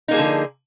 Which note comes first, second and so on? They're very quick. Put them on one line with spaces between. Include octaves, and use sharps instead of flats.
D#4 A#3 G#4 F3 D3